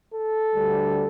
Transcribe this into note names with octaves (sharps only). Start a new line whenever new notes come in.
A4
D2 D3 G3